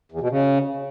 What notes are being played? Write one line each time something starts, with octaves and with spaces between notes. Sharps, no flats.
E2
B2
C#3